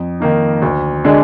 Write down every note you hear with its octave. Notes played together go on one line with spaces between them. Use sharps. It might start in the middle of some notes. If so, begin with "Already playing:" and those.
Already playing: F2
D#3 A#3 D#4
D2
D3 G#3 D4 G#4